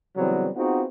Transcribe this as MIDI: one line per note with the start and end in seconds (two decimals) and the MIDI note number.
0.17 0.49 49
0.17 0.49 52
0.17 0.49 54
0.17 0.49 55
0.17 0.49 59
0.17 0.49 60
0.56 0.83 59
0.56 0.83 60
0.56 0.83 63
0.56 0.83 65
0.56 0.83 66
0.56 0.83 68